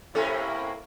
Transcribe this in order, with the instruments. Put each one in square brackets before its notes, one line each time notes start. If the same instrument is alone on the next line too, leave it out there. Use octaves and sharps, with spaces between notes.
[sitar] A2 C3 C#4 [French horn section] A#3 E4 [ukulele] A4